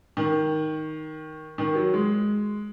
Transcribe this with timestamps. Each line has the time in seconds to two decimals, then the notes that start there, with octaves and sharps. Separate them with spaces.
0.17 D#3
1.58 D#3
1.75 F#3
1.94 G#3